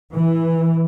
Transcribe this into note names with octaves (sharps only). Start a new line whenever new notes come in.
E3